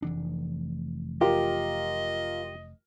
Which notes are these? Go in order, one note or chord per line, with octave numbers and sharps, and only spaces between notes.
F1 E3 D4
F4 G4 A#4 D#5